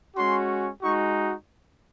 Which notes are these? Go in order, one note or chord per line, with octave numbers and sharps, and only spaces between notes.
G#3 C#4 F#4 C6
G#3 D#4 F#4 C#6